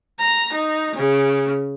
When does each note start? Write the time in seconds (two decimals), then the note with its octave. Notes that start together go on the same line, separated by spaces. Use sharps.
0.19 A#5
0.53 D#4
0.96 C#3